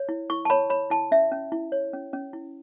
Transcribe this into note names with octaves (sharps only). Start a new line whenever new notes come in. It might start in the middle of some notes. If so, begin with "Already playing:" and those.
Already playing: C#5
E4
E4 C#6
A5
C#5 B5
C#5 B5
E4 A5
C#4 E5
C#4
E4
C#5
C#4
C#4
E4